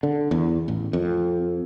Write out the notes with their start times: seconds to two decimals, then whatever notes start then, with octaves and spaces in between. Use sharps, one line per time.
0.03 D3
0.31 E2
0.68 A1
0.93 F2